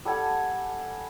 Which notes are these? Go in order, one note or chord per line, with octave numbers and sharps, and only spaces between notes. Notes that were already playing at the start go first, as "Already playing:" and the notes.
G3 A4 F#5 G#5